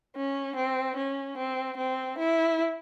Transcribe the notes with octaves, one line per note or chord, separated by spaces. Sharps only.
C#4
C4
C#4
C4
C4
E4